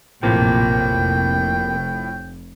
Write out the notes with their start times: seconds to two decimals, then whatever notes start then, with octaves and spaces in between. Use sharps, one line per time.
0.23 A#1 F#2 A2 C3 F3 A#3 G5
0.82 F1